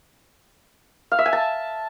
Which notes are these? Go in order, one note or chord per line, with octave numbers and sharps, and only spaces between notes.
F5
E5
G#5
A5